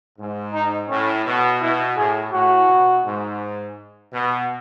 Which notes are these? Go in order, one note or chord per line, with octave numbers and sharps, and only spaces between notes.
G#2
D#4
A2 C#4
B2
B2 E4
A2 G#4
A2 F#4
B2
G#2
B2